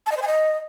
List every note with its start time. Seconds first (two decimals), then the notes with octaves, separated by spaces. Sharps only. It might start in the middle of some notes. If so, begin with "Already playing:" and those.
0.06 A5
0.12 D#5
0.17 C5
0.22 G#5
0.27 D#5